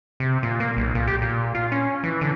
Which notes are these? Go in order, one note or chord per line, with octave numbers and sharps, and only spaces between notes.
C3
A#2
A#3
B1
A#2
G4
A#2
F4
C#4
E3
D3